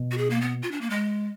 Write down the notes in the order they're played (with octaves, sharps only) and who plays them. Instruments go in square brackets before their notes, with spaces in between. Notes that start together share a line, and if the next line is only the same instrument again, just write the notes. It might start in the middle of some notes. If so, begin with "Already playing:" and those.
Already playing: [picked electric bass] B2
[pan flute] F#4
G#4
A#3
B3
F4
D4
A#3
G#3